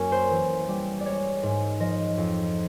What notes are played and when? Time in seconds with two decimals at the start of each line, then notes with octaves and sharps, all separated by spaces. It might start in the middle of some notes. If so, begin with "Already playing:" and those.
Already playing: F#2 F#3 A#3 C#4
0.12 C5
0.30 E3
0.68 G3
1.00 D5
1.05 G#3 C#5
1.43 G#2
1.80 F3 D#5
2.17 F2